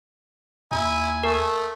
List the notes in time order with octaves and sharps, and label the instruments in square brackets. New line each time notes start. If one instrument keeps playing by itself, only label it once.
[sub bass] D#2 [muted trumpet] E4 [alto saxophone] G#5
[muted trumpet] A3 [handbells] A#4